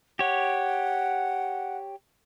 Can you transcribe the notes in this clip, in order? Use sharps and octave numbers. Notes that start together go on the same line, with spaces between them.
G4 C#5 F#5